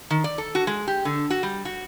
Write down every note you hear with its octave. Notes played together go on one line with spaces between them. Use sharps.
D#3
D5
A4
F#4
G#3
G4
D3
F#4
G3
F#4